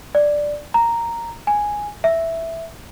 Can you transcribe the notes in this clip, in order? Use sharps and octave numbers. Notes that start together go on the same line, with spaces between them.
D5
A#5
G#5
E5